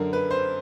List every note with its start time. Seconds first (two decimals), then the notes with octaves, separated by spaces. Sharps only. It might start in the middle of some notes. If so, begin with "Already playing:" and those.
Already playing: F#2 D3 A#4
0.13 B4
0.31 C5